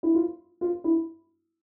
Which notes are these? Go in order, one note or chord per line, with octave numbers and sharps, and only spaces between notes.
E4
F4
F4
E4